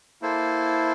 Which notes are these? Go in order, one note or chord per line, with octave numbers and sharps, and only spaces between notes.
A#3 E4 A4 C5